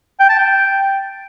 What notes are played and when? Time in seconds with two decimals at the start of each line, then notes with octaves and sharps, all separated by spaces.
0.20 G5
0.29 A5
0.39 G5